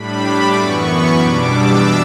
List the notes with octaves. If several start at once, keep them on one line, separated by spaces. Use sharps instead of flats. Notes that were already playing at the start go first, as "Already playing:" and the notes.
Already playing: A2 G3 D4 B5
D6
F#2 E3 B3 C#6
B5
E2 B2 G3 D4 D6
E6